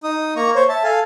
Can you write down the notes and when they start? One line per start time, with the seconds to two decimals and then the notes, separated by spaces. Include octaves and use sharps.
0.04 D#4 D#6
0.36 A#3 A#5 C#6
0.55 C5 C#5
0.69 E5 A5
0.84 A4 F5 G#5